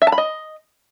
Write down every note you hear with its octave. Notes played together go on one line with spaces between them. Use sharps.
E5
A5
B5
D#5